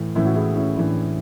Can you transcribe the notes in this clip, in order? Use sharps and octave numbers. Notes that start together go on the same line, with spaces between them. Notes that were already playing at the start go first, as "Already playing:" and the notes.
Already playing: A2 E3
A2 E3 C#4 E4
F#4
E4 G#4
C#4 E4
A2 E3 D4